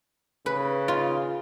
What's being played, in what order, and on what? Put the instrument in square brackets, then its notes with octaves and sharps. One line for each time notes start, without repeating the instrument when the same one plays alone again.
[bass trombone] C#3 [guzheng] B4
[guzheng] F4